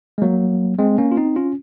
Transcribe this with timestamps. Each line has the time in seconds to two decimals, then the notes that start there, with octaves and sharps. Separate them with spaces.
0.18 G#3
0.22 F#3 A#3
0.79 G#3 C4
0.98 A#3 C#4
1.11 F4
1.17 C4 D#4
1.36 C#4 F4